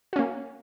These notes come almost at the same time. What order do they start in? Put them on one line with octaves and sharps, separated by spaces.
F#4 C#4 A#3